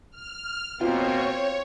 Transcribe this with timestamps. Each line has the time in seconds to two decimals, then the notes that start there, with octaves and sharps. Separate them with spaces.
0.10 F6
0.81 B2 A#3 C4 F4 C#5